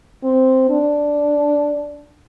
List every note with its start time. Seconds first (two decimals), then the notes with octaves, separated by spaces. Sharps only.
0.23 C4
0.69 D4